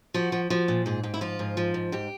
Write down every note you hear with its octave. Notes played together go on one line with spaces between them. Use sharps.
F3 F#4
F3
F3 F#4
A#2
G#2 G#4
G#2 G4
E4
F3 F4
G#2
F3
G#2
G#2 G4